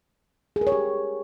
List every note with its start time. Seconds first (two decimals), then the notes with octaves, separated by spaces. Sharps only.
0.56 G#4
0.61 A#4
0.67 C#5
0.72 G4